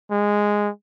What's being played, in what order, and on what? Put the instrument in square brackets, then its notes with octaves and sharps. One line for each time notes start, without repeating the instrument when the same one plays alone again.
[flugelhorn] G#3